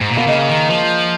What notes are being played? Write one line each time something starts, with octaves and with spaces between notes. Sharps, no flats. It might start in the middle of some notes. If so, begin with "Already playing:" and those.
G#2
A#2
B2 A#3
C#3 G#3
D#3
F3